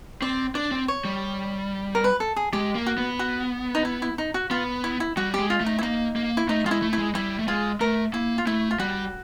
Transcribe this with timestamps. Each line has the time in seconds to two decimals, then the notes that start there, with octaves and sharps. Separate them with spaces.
0.22 C4 D5
0.55 D4 D5
0.72 C4
0.88 C#5
1.05 G3
1.95 A#4
2.04 B4
2.20 A4
2.36 G#4
2.53 G#3 G4
2.75 A#3
2.86 F#4
2.98 B3
3.19 F#4
3.75 D#4
3.85 E4
4.02 E4
4.18 D#4
4.34 F#4
4.51 B3 F4
4.84 E4
5.00 E4
5.17 G3 F#4
5.34 G4
5.39 G#3
5.50 F4
5.60 A3
5.66 D#4
5.79 E4
5.83 A#3 D#4
6.16 A#3
6.37 E4
6.49 A3 D#4
6.65 G#3 F4
6.71 E4
6.82 A3
6.93 E4
6.98 G#3
7.15 G3 E4
7.39 A3
7.47 G#3 F4
7.80 A3 A#4
8.13 A#3 E4
8.38 F4
8.47 A3 E4
8.71 F4
8.79 G3 F#4